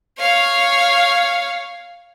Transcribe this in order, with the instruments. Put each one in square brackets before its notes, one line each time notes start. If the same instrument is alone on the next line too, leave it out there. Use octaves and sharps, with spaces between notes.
[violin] C#5 F5